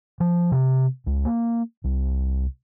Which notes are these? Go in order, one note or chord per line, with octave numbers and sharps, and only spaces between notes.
F3
C3
C#2
A#3
C2